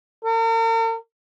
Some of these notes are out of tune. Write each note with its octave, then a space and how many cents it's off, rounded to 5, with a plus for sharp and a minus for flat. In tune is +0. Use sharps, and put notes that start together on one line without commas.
A#4 -45